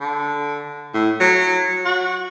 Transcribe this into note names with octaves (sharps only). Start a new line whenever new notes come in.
D3
A2
F#3
F#4